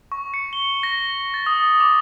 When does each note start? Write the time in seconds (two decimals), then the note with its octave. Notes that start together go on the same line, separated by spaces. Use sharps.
0.12 C#6
0.34 C#7
0.53 G7
0.83 A#6
1.34 A6
1.46 D#6
1.80 D6